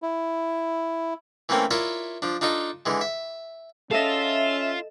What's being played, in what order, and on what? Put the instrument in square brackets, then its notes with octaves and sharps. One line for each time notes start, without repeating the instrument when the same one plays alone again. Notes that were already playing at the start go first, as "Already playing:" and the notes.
[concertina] E4
[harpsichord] E3 A3 A#3 C4 C#4
E4 F4 A#4 C#5 D5 E5
F3 D4
D4 D#4 F4 A4 D#5
D3 E3 G#3
E5
[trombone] C#4 [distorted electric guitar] F4 [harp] A4 D#5 [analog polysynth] E5 E7